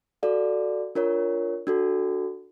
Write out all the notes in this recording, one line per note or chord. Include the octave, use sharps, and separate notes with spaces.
F#4 A4 D5 F5
D4 F4 A#4 C#5
D4 F#4 A4